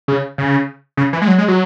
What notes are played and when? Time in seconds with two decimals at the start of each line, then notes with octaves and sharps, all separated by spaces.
0.08 C#3
0.38 C#3
0.97 C#3
1.13 E3
1.22 G#3
1.28 F#3
1.38 G#3
1.48 F#3